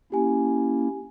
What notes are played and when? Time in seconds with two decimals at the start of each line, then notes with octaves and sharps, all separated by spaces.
0.12 A#3 C#4 E4 G4 G#5